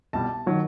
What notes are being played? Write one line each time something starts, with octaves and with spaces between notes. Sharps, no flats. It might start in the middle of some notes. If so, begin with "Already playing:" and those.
C2 B2 G3 A5
D#3 F#3